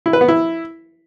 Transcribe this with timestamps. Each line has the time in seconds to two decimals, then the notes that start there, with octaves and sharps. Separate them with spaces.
0.06 E4
0.13 B4
0.21 B3
0.28 E4